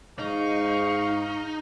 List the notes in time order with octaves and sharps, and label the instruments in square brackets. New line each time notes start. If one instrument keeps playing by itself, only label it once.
[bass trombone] G#2 [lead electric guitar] D#4 [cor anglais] F5 [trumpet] C#6